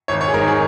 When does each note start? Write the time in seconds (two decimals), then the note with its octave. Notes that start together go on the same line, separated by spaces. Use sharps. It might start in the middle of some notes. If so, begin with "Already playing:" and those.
0.08 G#1 C#5
0.21 C#5
0.28 G#4
0.34 G#2 D#3 A#4
0.48 G#4